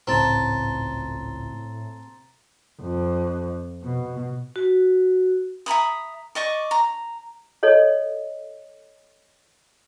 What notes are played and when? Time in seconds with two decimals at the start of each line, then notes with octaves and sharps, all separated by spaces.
0.07 G#1 C#2 A2 C4 A5 A#5 C6 A6
2.82 F2
3.83 B2
4.56 F#4
5.66 E5 A#5 B5 D#6
6.35 D5 D#5 C#6
6.71 A#5
7.63 A4 C#5 D#5